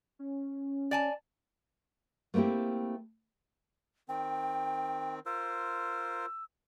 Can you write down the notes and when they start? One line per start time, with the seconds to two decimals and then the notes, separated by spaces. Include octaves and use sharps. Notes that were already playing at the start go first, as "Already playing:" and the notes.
0.19 C#4
0.91 D5 G#5 A5
2.34 A3 A#3 C4 E4 G4
4.09 D#3 C4 G5
5.26 F4 A#4 C5 E6